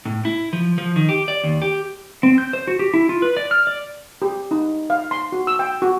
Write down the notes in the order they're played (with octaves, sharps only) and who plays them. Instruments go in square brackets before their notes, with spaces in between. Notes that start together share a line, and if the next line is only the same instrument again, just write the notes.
[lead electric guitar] A2
E4
F3
F3
D#3
G4
D5
D#2
G4
[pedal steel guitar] C4
G6
C5
F#4
G4
E4
F4
B4
D5
F6
D5
[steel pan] G4
D#4
F5
C6
F#4
E6
G5
F#4